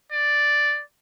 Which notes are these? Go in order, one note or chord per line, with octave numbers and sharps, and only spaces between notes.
D5